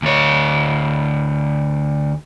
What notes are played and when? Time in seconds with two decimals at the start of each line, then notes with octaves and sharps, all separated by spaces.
0.02 D2 C#5